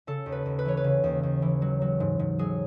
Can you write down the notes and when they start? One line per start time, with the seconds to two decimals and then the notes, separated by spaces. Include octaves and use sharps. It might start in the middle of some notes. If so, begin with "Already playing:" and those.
0.07 C#3 A4
0.26 D#2
0.32 B4
0.46 D#2
0.59 B4
0.65 E3 C#5
0.77 B4
0.84 C#3
1.04 D#2
1.23 D#2
1.42 E3
1.62 F#3
1.82 F#3
2.00 G#2
2.19 G#2
2.39 F#3 G#4